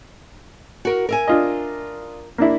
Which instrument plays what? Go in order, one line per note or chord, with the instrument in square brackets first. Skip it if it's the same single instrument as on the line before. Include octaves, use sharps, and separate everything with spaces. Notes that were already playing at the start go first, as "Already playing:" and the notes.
[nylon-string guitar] F#4 A#4
A#4 E5 G#5
[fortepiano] D4 F4 D#5
A#3 D4 E4